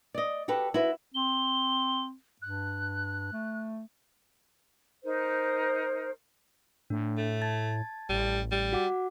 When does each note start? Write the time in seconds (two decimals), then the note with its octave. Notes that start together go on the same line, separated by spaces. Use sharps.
0.15 D5 D#5
0.48 F#4 G4 A4 B4
0.74 E4 F#4 B4
1.14 C4 G7
2.42 G2 F#6
3.33 A3
5.04 D#4 A#4 C5
6.90 A2 D4
7.17 A3
7.42 A5 G#6 A6
8.09 A1 G3
8.52 G3
8.72 F#4 F#5 D6